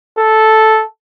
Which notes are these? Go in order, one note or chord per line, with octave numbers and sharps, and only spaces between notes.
A4